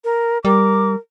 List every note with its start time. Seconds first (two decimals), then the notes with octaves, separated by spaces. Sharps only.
0.04 A#4
0.45 G3 A#4 D6